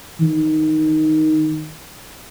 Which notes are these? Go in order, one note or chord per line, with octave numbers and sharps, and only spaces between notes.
D#3